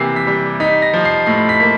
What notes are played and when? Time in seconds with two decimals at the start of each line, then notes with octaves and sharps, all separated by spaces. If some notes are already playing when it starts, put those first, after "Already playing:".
Already playing: C3 E3 A#3 C7
0.16 B6
0.27 G3
0.60 D#4 B6
0.82 A#6
0.94 F3
1.05 C7
1.26 A2 C7
1.49 B6
1.60 A#3